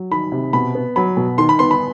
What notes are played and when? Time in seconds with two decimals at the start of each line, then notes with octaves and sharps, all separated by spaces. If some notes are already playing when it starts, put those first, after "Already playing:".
Already playing: F#3
0.11 D#3 B5
0.32 C3
0.53 B2 B5
0.75 B3
0.96 F#3 B5
1.17 B2
1.38 D#3 C6
1.49 B5
1.59 B3 C6
1.71 B5